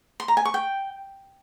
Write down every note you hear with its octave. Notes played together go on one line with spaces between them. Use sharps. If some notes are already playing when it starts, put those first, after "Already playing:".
C6
A#5
G#5
C#6
G5